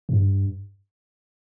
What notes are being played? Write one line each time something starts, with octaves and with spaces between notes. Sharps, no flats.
G2